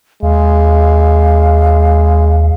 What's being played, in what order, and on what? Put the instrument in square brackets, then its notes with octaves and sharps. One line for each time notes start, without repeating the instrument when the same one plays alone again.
[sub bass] D#2 [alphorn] G#3 [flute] F5